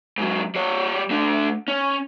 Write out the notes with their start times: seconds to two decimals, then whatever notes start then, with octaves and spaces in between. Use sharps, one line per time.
0.18 G#2 F#3
0.55 G3 C#5
1.10 A3 D4
1.68 C#4